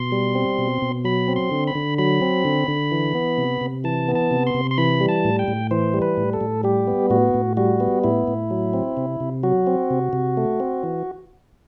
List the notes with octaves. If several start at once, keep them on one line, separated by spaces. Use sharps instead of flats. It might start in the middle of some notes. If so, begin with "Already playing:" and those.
Already playing: B2 C6
G3
C4
B2
B2
F#3 B5
C4
C6
D3
B5
D3
F#3 B5
C4
D3
D3
E3
B3
C3
C3
E3 A5
B3
A5
C3
C6
C3
C6
E3 B5
G3
A5
A2
G5
A2
E3 C5
G3
B4
A2
A4
A2
G3 G4
B3
A2 F#4
A2
G3 F#4
B3
A2 E4
A2
F#3
C4
C3
C3
F#3 F#4
C4
C3
C3
A3
C4
E3